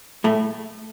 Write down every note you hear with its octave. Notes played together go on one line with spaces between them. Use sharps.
A2 A3